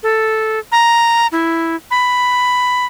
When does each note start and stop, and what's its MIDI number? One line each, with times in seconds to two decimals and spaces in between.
0.03 0.59 69
0.72 1.27 82
1.32 1.76 64
1.91 2.86 83